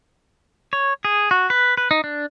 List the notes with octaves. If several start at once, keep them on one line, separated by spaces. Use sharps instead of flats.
C#5
G#4
F#4
B4
B4
D#4
D4